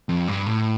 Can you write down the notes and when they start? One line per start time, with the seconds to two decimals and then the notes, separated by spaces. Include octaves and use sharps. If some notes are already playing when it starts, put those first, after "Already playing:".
0.09 F2
0.28 G2
0.46 A2